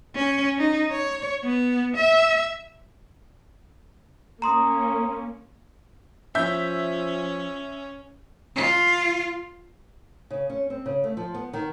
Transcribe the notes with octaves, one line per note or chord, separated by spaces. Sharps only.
C#4
D#4
C#5
B3
E5
A#3 C#4 A#5 C6 D#6
F3 C#4 E5 G6
F4
C#3
C#4
C4
C#3
A3
F3
B3
D#3